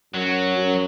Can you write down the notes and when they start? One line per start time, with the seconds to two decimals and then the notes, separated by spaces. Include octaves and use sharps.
0.14 F#2 F#3
0.56 F#2